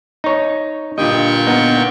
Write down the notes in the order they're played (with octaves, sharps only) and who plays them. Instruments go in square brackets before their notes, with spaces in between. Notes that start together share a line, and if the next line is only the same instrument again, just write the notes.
[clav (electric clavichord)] D#4 C#5
[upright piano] G2 D3 F4 [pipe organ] A#2 G5 C#6 [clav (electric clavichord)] D#5
[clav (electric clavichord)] B3 D#4